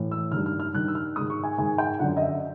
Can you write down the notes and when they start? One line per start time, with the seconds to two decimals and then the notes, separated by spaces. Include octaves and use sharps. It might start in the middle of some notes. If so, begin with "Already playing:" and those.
Already playing: A2 E3
0.11 E6
0.32 G2 D#3 F6
0.46 F6
0.60 F6
0.74 G2 D#3 F#6
0.88 E6
0.95 F6
1.16 G#2 D#3 D#6
1.30 C#6
1.43 G#5
1.58 G#2 D#3 G#5
1.78 G5
1.99 F#2 D3 F#5
2.17 D#5
2.21 E5